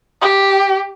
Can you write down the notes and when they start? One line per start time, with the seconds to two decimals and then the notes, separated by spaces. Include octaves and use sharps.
0.21 G4